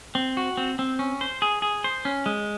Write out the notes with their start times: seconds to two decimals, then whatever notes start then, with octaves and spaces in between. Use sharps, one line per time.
0.15 C4
0.37 F#4
0.57 C4
0.79 C4
0.99 C#4
1.21 C5
1.42 G#4
1.62 G#4
1.84 C5
2.05 C#4
2.26 G#3